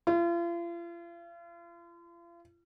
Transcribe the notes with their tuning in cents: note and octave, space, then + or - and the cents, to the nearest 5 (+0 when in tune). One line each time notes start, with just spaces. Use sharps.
F4 -40